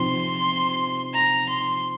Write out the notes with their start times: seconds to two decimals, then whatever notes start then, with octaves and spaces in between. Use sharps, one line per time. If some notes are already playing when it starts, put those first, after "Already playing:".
Already playing: C3 F3 C4 D#4 C6
1.14 A#5
1.49 C6